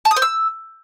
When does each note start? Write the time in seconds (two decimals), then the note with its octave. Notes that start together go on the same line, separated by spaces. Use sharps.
0.05 A5
0.11 D#6
0.16 C5
0.22 E6